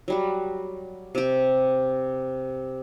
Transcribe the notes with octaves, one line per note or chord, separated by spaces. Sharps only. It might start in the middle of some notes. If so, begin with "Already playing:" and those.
F#3 G3 F#4
C3 G4